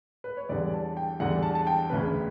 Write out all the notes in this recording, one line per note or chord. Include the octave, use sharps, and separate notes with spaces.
B4
C#5
E2 D3 G3 D5
A5
G5
E2 D3 G3 F#5
A5
A5
G5
E1 D2 C#3 B4